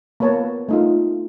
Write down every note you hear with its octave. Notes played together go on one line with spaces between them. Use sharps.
A#3 B3 B4 C#5 A5 A#5
A3 D#4 F4